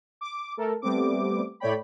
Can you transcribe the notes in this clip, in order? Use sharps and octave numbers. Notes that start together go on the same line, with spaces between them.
D6
A3 A4 A#4
G3 A3 B3 C4 D6
A2 A3 C#5 D5 G5 B5